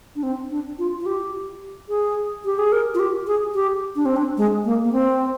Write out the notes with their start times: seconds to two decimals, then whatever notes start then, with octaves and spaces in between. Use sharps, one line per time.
0.16 D4
0.23 C4
0.51 D4
0.79 F4
1.00 F4
1.06 G4
1.89 G#4
2.45 G4
2.59 G#4
2.72 A#4
2.94 F4
2.99 G4
3.27 G#4
3.54 G4
3.96 D4
4.06 C4
4.16 D4
4.37 G#3
4.65 A#3
4.85 A#3
4.92 C4